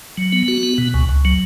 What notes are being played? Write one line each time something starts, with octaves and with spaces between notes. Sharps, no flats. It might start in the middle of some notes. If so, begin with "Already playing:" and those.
F#3
B3
F#4
B3
B2
C#2
C#2
F#3